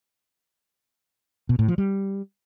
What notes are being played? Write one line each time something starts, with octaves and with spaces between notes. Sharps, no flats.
B2
A2
F3
G3